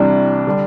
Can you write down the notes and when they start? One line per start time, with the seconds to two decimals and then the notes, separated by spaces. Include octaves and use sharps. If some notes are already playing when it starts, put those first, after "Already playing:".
Already playing: C2 C3 E3 G3 D4
0.47 D3 G3